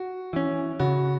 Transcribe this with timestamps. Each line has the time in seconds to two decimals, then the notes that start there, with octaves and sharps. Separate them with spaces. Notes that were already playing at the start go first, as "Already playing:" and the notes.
Already playing: F#4
0.33 E3 C#4
0.80 C#3 F#4